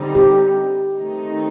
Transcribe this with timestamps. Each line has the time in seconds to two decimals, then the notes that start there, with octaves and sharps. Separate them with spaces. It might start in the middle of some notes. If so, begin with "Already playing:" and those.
Already playing: D3 G3 C4 D#4
0.15 G4
0.99 D#3 A3 C4 D#4